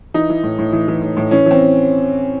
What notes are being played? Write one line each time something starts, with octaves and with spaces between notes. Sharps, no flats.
E3 D#4
E3
A2
A2
E3
E3
A2
A2
E3 C#4
E3 C4